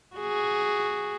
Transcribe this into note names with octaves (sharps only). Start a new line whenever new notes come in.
F#4 G#4